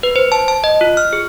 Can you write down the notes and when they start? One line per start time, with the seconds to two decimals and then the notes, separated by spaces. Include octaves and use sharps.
0.03 B4
0.16 C5
0.32 A5
0.48 A5
0.64 D#5
0.81 F4
0.97 F6
1.13 G#4